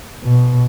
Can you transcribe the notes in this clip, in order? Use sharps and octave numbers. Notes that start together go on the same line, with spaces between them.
B2